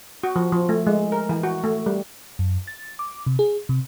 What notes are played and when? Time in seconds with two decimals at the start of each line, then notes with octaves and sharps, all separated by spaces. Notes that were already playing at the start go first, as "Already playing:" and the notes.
0.23 F#4
0.36 F3
0.52 F3
0.69 A3
0.87 G#3
1.12 A#4
1.29 E3
1.43 F#4
1.64 A3
1.86 G3
2.39 F#2
2.67 A6
2.99 D6
3.26 C3
3.39 G#4
3.69 C3